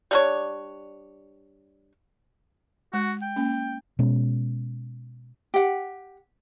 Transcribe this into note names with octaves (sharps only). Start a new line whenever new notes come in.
G3 D4 C#5
G#3 F#4
G5
A#3 C#4
B2 G#3 C#4
G4 F#5